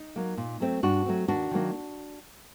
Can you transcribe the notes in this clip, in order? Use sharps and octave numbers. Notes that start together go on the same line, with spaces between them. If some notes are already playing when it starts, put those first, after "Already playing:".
Already playing: D#4
F#3 A#3
A#2
F#3 A3 C4
G2 D4 F#4
F#3 A3 C4
D#2 D4 F#4
D#3 F#3 A#3